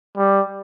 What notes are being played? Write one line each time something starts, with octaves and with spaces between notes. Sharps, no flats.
G3